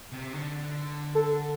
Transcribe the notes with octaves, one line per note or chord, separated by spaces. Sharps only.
C3
D3
A4